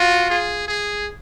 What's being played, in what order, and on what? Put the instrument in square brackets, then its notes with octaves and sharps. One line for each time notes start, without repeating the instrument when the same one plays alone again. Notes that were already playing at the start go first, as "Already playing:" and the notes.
Already playing: [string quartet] F4 [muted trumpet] F#4
[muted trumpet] G#4
G#4